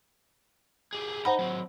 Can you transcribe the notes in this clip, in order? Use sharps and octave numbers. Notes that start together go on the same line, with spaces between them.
G4 G#4
D#4 C5 F#5 A#5 B5
F#3 C4